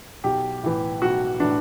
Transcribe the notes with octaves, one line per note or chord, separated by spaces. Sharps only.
B1 G4
A2 E3
B1 F#4
A2 E3 D4